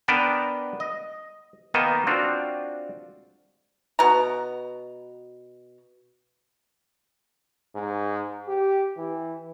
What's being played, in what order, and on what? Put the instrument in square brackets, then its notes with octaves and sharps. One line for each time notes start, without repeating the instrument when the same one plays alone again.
[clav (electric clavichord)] B3 D4 A#4 B4 G5 A5
D#5
D#3 A#3 B3 D#4 D#5 A5
C4 D4 F4 F#4
[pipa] B2 A#5
[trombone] G#2
G4
E3